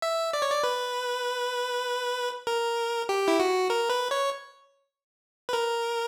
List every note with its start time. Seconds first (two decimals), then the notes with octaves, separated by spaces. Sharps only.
0.02 E5
0.33 D5
0.42 C#5
0.52 D5
0.64 B4
2.47 A#4
3.09 G4
3.28 E4
3.40 F#4
3.70 A#4
3.89 B4
4.11 C#5
5.49 B4
5.53 A#4